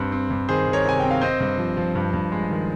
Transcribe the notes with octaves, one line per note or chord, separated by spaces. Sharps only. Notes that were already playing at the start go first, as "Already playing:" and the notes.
Already playing: G2 C4
C4
G2
D#3 G#4 C5
D#3
A#4 C#5
C3 G#5
C4 G5
F5
C4 C5 D#5
G2
F3
F3
G2
G2
G#3
D#3